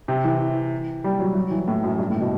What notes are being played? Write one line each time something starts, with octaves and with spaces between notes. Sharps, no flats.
C3
E3
G3
F#3
F#3
E3
A2
F#2
G2
A2
C3
B2